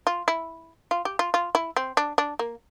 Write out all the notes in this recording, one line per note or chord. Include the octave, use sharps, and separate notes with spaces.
F4
E4
F4
G4
F4
F4
E4
C4
D4
D4
A#3